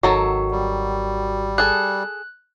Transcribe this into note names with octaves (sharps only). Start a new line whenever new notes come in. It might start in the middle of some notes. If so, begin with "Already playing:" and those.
G#1 D#3 F#3 F#4 A4
G3
G#4 A4 F#6